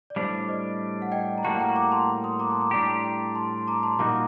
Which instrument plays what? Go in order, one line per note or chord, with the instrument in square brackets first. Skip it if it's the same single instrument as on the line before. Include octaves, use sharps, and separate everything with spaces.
[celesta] D5
[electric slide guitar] A2 G3 D4 [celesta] C5
[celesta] C5 D#5
F#5
D#5 G5
A#5
[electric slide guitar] A2 G3 A#3 F#4 [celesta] F#5 A5
[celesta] G5 A#5
A#5 D6
A5 C6
C6 D#6
A#5 D6
A5 C6
A#5 D6
[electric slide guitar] A2 G3 D4 G4 [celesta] A#5 D6
[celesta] A5 C6
G5 A#5
A5 C6
C6
A#5 D6
A5 C6
[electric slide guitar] A#2 G3 A#3 D#4 F#4 [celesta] A#5 D6